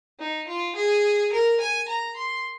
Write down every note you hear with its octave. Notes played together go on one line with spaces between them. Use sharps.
D#4
F4
G#4
A#4
G#5
A#5
C6